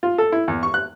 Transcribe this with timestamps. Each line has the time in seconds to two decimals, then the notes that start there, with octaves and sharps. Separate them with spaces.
0.03 F4
0.18 A4
0.32 E4
0.48 E2
0.63 C#6
0.74 F#6